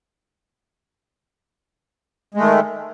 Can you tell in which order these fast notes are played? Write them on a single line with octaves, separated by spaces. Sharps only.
G#3 A3 D#3